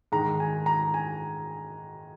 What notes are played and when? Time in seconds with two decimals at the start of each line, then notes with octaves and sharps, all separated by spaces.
0.12 G#2 D#3 A#5
0.40 G#5
0.66 A#5
0.94 G#5